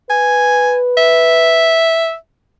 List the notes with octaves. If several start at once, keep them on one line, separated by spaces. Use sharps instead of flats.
B4 G#5
E5